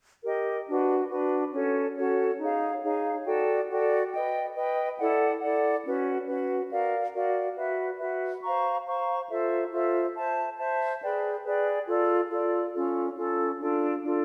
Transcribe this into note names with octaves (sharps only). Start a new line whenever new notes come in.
G4 A#4 D#5
D4 F#4 B4
D4 F#4 B4
C#4 F#4 A4 C#5
C#4 F#4 A4 C#5
D#4 G#4 C#5 F5
D#4 G#4 C#5 F5
F#4 A4 D5 G5
F#4 A4 D5 G5
B4 D#5 G5
B4 D#5 G5
E4 A4 D5 F#5
E4 A4 D5 F#5
C#4 F#4 B4
C#4 F#4 B4
F#4 A#4 D5 F5
F#4 A#4 D5 F5
F#4 B4 E5
F#4 B4 E5
C5 F5 A#5 C#6
C5 F5 A#5 C#6
F4 A4 C5 E5
F4 A4 C5 E5
C5 E5 A5
C5 E5 A5
G#4 B4 D5 G5
G#4 B4 D5 G5
F4 A4 D5
F4 A4 D5
C#4 F4 A4
C#4 F4 A4
D4 F4 A4
D4 F4 A4